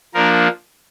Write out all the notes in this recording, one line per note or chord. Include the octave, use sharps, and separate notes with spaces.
F3 A#3 D4 A#4